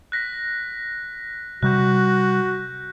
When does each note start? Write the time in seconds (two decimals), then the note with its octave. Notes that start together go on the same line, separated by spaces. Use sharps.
0.12 F#6 A#6 B6
1.63 C3 G3 F#4 F#6 G6